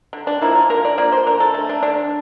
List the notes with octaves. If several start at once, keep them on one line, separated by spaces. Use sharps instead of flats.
D3
D4
F3 A#3 E4
F4
D3 A#4
D5
F3 A#3 D5
C5
D3 A#4
A4
A3
D4
D3 D4